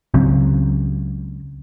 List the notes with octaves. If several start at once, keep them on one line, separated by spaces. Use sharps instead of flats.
C#2 C#3 F#3 C4